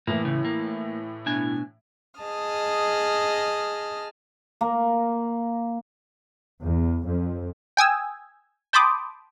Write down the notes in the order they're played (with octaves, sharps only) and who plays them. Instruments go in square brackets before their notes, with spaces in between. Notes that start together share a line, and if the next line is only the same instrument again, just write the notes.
[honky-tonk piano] A2 E3 [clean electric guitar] A#3
[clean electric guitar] C#2 C#3
A#3
B2 D4 G#5
[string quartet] G#4 D#5 A5 D#6 F6
[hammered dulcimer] A#3
[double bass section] E2
F2
[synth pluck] G5 G#5 D#6 E6
G5 A5 B5 C6 D6 D#6